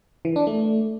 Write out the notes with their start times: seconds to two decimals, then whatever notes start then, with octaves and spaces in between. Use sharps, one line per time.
0.25 E3
0.36 D4
0.47 A3